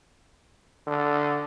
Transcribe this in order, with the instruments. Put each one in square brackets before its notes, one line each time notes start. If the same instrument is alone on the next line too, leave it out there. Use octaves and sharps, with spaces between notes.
[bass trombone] D3